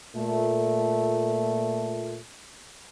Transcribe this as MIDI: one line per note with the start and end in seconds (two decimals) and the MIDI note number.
0.15 2.19 46
0.15 2.19 57